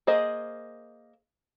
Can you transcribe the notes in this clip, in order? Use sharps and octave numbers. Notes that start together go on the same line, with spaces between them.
A#3 G#4 C5 D#5